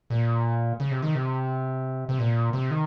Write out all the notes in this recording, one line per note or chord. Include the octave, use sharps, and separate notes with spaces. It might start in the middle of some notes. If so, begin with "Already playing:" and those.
A#2
C#3
C3
D#3
C3
C3
A#2
C3
D#3